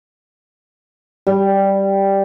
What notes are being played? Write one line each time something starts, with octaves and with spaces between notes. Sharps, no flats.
G3